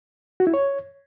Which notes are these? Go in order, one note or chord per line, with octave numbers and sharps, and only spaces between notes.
F#4
E4
C#5